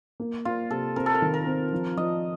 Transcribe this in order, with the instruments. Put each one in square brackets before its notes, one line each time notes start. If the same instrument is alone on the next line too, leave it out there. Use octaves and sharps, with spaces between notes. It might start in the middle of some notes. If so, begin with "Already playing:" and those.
[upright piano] A#3
[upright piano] A#3 [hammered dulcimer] F4
[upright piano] C3 [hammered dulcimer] A4
[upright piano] C4 [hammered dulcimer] A#4
[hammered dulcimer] A4
A#4
[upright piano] D#3
[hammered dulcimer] A#4
[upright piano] C4
F3
[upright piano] F3 [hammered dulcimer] D#5